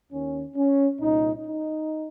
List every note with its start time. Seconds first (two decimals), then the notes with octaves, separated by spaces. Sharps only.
0.11 D#2 D#3 C#4
0.56 C#4
1.00 C2 A#2 D#4
1.44 D#4